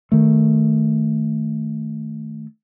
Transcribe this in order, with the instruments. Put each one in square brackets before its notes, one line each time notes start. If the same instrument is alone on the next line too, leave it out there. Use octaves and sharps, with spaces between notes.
[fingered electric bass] D#3 A3